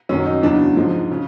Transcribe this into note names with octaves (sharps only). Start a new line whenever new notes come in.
F#2 D#3 F#3 C#4
D#4
E2 C#3 F#3 D4
G#2 F3 G#3
C#3